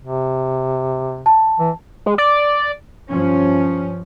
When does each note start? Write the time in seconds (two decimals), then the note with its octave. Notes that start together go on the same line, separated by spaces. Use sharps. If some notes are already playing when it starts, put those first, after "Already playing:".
0.02 C3
1.26 A5
1.59 E3
2.06 G#3
2.18 D5
3.08 G2 F3 C#4